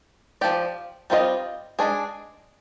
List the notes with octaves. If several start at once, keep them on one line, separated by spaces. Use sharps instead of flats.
F3 C4 G4 D5
G3 C4 F4 B4 D#5
G#3 D4 G#4